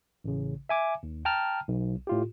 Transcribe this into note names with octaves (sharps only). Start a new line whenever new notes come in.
A1 C#3
E5 G#5 D6
D#2
G5 A5 A#5 F6
B1
A2 F4 G4